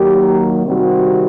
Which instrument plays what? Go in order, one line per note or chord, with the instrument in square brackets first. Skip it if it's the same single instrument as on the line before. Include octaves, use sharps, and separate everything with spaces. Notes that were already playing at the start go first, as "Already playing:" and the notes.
Already playing: [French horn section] D#3 F#3 A#3 G4
C3 D#3 G3 C4 F#4